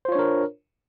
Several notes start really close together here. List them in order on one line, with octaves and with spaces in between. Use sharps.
C5 F4 C#5 D4 A#4